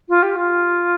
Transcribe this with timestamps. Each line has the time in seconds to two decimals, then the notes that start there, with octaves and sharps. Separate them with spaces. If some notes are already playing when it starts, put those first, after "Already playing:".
0.09 F4
0.22 G4
0.35 F4